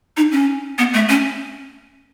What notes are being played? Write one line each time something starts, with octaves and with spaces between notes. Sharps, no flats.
D#4
C#4
B3
A3
C#4